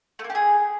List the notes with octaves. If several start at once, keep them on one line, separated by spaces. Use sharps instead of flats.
A3
A#3
G4
G#4